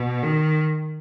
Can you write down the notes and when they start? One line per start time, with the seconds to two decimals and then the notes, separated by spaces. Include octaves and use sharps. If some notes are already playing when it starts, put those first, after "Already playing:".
Already playing: B2
0.23 D#3